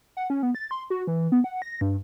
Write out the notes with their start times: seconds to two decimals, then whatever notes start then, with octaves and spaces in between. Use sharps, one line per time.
0.17 F#5
0.30 C#4
0.43 B3
0.55 A6
0.71 C6
0.90 F#4
1.07 E3
1.32 B3
1.44 F#5
1.62 A#6
1.81 G2